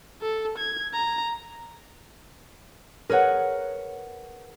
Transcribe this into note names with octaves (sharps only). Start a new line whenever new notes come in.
A4
G#6
A#5
G#4 A#4 B4 C#5 F#5